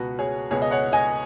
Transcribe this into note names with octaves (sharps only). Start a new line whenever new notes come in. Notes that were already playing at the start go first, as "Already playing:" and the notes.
Already playing: C#2 B2 B3 F#4 B4
G#4 C#5
C#2 B2 B3 G#4 C#5
D#5
C#5 F#5
D#5 G#5